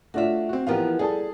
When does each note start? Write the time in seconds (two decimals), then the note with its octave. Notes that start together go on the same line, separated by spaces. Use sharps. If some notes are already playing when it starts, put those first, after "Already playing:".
0.14 A3 D4 F4 F#4 C#5 E5
0.49 C4 F#4
0.67 E3 F3 B3 G4 A#4 F5
0.99 G3 G#4 A4 A5